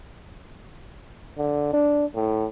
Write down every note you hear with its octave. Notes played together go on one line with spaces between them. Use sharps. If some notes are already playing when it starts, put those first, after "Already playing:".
D3
D4
A2